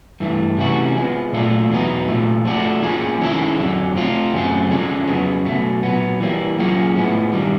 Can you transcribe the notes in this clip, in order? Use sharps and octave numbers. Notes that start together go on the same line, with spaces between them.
G2 E3 A3
C3 E3 A3 C#4 F#4
F3 G#3 B3
A#2 F#3 A3 D4 F4
E2 B2 F#3 B3 D#4
A#2 F3 A3
F3 A3 D4 F#4 A4
F3 A#3 C#4 F4 G#4
D#3 G#3 C#4 E4 A4
F2 D3 F#3
F3 A3 C4 F4
F#2 C#3 F#3 A3 C4
D3 F3 G#3 C#4
F2 C#3 F#3 B3
B2 F#3 A3
A#2 F#3 B3
E3 G3 A#3
F#3 A#3 C#4 F4 G#4
A2 F3 G#3 B3
G2 D#3 G3